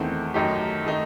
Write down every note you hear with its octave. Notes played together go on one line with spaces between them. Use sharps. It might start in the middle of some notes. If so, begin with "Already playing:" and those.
Already playing: E2 D#3 A3 C4
F#2 D#3 A3 D#4 G4
D#3 A3 D#4